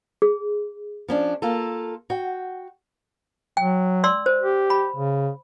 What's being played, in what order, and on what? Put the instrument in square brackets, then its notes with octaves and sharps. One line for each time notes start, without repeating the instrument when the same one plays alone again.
[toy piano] G#4
[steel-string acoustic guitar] F3 C#4 D4
A#3 F4 A4
F#4 G5
[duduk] F#3 [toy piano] G5
[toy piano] D5 C6 E6
C5
[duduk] G4
[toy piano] B5
[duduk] C#3